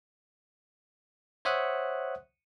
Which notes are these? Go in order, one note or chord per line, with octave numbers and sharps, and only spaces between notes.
C5 C#5 E5 F#5 D#6 F#6